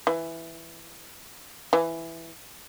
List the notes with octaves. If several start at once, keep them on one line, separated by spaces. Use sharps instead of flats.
E3
E3